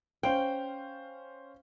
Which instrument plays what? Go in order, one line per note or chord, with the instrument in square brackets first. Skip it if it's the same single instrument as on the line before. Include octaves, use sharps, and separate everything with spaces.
[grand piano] C#4 C5 F5 [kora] G5